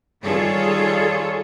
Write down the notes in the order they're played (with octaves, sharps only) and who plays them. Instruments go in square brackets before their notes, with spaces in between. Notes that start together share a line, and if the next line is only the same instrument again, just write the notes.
[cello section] D#3 G3 F4 G#4 A4 C#5